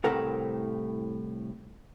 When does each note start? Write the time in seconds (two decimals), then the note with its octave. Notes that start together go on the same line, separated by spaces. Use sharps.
0.04 C2 A2 A3 C4 A#4 F#5